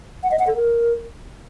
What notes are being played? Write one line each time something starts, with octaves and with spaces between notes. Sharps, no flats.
F#5
D#5
F#5
A4
A#4